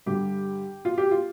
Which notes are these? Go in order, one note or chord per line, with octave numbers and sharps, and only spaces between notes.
G2 D3 G3 G4
F4
G4
F4